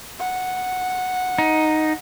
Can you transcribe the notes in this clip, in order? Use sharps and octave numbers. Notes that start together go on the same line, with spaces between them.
F#5
D#4